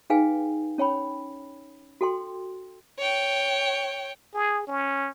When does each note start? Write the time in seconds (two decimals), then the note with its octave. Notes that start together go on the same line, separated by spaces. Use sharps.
0.10 D#4 G#4 B4 F5 G5 G#5
0.78 C#4 C#5 G5 B5
2.01 F#4 A4 G5 C6
2.98 C#5 G5
4.34 G#4
4.67 C#4